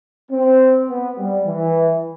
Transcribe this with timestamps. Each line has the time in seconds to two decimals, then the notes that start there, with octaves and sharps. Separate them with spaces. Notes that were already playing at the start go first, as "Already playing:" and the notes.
0.31 C4
0.88 B3
1.17 G3
1.46 E3